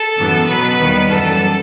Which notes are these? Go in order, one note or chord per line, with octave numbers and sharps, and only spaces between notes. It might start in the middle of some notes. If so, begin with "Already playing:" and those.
Already playing: A4 A5
F#2 E3 B3
B2 F#3 B3 B4 B5
D#2 D#3 G3 B3
F#2 E3 G3 A4 A5